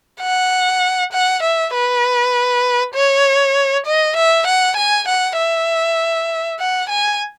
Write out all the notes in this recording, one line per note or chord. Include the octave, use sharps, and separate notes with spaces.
F#5
F#5
E5
B4
C#5
D#5
E5
F#5
G#5
F#5
E5
F#5
G#5